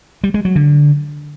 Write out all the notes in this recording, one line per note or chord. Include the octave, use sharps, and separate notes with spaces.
G3
G#3
F#3
D3